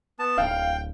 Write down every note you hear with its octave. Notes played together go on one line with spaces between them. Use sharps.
B3 A5
D1 F5 G5